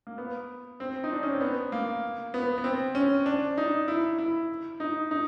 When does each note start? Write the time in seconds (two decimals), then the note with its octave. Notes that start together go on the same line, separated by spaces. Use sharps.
0.07 A#3
0.18 B3
0.80 C4
1.04 D#4
1.13 D4
1.23 C#4
1.32 C4
1.41 B3
1.72 A#3
2.34 B3
2.58 B3
2.64 C4
2.95 C#4
3.26 D4
3.57 D#4
3.88 E4
4.18 E4
4.80 D#4
5.11 D#4